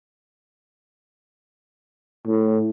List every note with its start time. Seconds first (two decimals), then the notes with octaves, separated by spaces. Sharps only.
2.27 A2